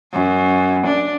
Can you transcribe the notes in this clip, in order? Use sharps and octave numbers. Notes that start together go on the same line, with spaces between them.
F#2
D4